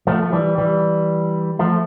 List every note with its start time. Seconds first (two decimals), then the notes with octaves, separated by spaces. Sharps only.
0.07 F3 A3
0.23 A3
0.33 E3 G3
0.58 E3 G3
1.59 F3 A3